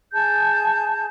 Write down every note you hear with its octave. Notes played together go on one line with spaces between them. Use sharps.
G#4 A5 G6